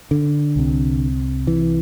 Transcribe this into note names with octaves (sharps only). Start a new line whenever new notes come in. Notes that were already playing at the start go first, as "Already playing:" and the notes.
D3
C2 C3
E3